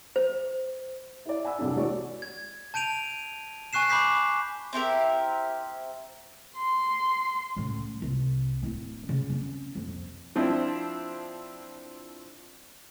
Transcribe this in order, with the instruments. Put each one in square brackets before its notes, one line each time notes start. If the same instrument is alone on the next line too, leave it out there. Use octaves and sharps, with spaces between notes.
[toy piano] C5
[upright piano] E4 D5
F#5 G#5 B5 E6
C2 F2 D4
E3 G#3 F#4 C#5 D5
[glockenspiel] G#6
A5 G6 D7 D#7 F7
G#5 C#6 F#6 C7 E7
B5 C#6 D6 G6 B6 C7
[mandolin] C4 E4 G4 A#4
[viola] C6
[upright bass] A2 C#3
C2
D1 E4
C#3
C4 C#4
D#1 F2
[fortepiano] F3 C4 D4 E4